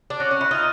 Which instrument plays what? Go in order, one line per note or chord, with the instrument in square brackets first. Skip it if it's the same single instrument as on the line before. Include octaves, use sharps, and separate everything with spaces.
[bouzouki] D4
[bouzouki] C#4 [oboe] F#4
[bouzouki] C#4
E4
[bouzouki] D#4 [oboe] F4